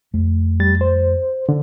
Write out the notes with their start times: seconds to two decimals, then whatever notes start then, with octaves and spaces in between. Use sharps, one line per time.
0.14 F2 A3
0.60 G3 A6
0.81 C5
1.49 D3